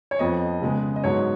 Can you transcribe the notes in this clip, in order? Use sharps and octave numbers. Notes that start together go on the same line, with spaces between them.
C#5
F2 F3 B3 D#5
C#3 G#3 B3
D#5
G#2 F#3 B3 C#5